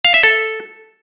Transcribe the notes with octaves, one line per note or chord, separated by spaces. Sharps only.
F5
E5
A4